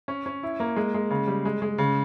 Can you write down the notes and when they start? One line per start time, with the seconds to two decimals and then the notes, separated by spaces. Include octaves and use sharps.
0.08 C#4
0.26 C#4
0.43 E4
0.60 A#3
0.76 G#3
0.94 G#3
1.10 C#3
1.27 G3
1.45 G#3
1.62 G#3
1.78 C#3